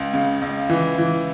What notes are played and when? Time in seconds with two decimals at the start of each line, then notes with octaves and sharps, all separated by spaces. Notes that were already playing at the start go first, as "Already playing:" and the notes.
Already playing: C#2
0.14 C#3
0.42 C#2
0.70 E3
0.98 E3